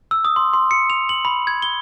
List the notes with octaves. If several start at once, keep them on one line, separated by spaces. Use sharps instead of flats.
E6
D#6
C6
C6
C#7
F7
F#7
B5
G#6
G7